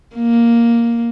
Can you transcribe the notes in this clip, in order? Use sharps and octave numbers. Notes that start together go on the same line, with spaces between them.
A#3